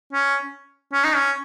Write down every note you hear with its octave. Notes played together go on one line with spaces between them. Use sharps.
C#4
C#4
D#4
C#4